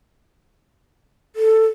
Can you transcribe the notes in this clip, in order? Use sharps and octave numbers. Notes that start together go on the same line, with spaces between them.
A4